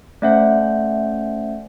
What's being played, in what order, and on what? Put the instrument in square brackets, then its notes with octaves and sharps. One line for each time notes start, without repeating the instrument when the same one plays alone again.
[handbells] A3 C#4 C5 [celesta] D5 E5 F#5